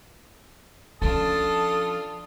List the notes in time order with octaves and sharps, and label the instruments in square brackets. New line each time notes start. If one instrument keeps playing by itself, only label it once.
[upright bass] F3 C#4 [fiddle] D4 F4 [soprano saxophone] A4 [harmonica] A5 D#6